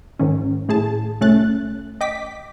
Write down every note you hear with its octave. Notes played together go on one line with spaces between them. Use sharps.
G#2 D#3 C#4
A2 G#4 A5
C2 A3 C#4 F#6 A6
D#5 G5 D6 B6